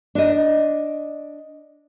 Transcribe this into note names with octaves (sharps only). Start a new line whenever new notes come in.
D4 D#5